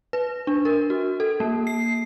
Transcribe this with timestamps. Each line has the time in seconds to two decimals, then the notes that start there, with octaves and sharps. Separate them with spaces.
0.13 B4
0.47 D4
0.65 A#4
0.90 F#4
1.20 A4
1.40 A#3
1.67 C7